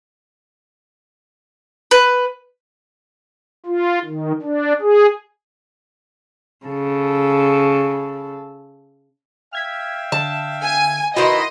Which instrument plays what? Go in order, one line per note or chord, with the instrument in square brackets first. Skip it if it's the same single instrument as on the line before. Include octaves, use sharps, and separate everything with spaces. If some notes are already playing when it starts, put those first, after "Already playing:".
[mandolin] B4
[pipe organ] F4
D#3
D4
G#4
[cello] C#3 A4
[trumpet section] E5 F5 G5 [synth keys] F6 G#6 B6
[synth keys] D3 [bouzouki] A5
[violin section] G#5
[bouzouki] D#3 E4 [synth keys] F#4 B4 [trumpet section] C5 F#5 C6 [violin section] D#5